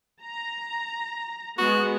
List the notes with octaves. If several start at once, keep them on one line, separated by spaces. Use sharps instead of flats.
A#5
G#3 B3 F#4